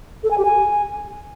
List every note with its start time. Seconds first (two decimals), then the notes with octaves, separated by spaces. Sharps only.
0.24 A4
0.31 G#5
0.38 G4
0.45 G#5